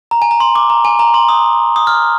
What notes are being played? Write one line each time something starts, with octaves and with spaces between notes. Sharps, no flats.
A#5
G#5
A#5
C6
D6
A#5
G#5
A#5
C6
D#6
D#6
F6